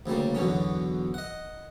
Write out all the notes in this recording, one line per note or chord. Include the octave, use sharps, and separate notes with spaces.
D2 C#3 G3 A#3
E2 B2 D3 F#3 C#4
D#5 F#5